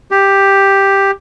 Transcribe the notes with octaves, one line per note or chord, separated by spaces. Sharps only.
G4